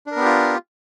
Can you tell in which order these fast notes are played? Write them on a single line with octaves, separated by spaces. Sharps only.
D4 A#4 B3 G4 F4